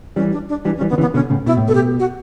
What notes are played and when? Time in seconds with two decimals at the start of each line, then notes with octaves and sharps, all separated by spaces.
0.16 E3 G3 C#4
0.32 D4
0.49 D4
0.65 E3 G3 D4
0.77 C#4
0.81 E3 G3
0.89 B3
0.93 D3
0.98 C#3 E3
1.01 B3
1.14 B2 D3 C#4
1.30 A2 C#3
1.46 B2 E4
1.57 A2
1.68 B2 A4
1.75 G4
1.99 F#4